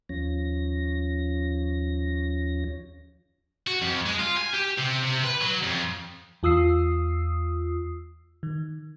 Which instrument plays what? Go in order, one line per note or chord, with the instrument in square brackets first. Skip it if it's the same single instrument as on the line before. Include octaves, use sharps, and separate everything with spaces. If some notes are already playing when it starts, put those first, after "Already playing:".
[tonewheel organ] D#2 F3 C#4 A#6
[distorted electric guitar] F#4
F2
G#3
F4
G#5
G4
C3
C3
B4
F#3
F2
[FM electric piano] E2 F4 D#6 E6 C7
D#3